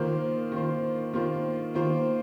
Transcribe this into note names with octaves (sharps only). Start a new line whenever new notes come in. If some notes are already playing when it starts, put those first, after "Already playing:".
Already playing: D#3 A#3 F4 C5
D#3 A#3 F4 C5
D#3 A#3 F4 C5
D#3 A#3 F4 C5